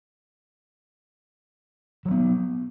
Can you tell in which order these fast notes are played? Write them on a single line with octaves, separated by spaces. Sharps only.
F#3 A3 B3